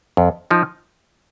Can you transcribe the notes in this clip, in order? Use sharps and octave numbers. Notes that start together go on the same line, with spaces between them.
F2
F3 D#4